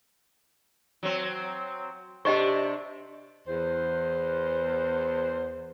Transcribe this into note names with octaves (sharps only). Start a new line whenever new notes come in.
F#3 C4
C3 D4 G4 C5 D#5 C#6
E2 C5